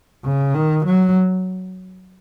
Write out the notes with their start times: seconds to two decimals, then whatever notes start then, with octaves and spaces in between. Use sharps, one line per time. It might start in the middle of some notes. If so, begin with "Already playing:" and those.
0.24 C#3
0.54 D#3
0.86 F#3